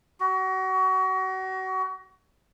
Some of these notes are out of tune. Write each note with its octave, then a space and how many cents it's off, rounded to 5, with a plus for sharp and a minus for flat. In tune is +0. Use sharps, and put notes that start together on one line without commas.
F#4 +30